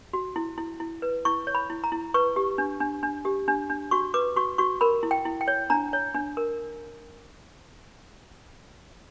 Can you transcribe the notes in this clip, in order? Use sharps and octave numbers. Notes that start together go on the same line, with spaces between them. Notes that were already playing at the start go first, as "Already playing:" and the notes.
F#4
E4
E4
E4
B4
E4 C#6
C#5
B5
E4
A#5
E4
B4 C#6
G4
D4
D4
D4
G4
D4
D4
F#4 C#6
B4 D6
F#4 C#6
F#4 C#6
A#4 B5
E4
G5
E4
G5
C#5
D4 A#5
C#5
D4
A#4